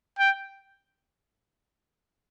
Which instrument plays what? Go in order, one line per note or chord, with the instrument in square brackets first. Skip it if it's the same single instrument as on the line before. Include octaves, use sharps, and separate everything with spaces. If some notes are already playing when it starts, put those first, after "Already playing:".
[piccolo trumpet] G5